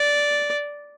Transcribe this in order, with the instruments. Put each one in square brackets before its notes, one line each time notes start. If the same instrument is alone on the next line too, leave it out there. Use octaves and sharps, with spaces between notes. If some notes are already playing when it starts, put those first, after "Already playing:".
Already playing: [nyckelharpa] D5